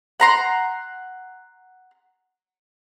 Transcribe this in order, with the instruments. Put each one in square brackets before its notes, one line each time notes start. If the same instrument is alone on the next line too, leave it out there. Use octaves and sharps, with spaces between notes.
[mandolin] F#5 A#5 C6